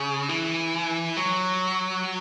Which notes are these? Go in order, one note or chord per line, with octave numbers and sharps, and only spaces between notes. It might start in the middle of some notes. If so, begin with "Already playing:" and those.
Already playing: C#3
E3
F#3